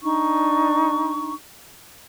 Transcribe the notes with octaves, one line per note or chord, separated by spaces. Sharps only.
D4 D#4 C#6